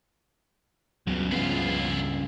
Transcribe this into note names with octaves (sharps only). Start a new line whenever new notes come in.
C#2 G2 C#3 F#3 B3
F3 B3 E4 F4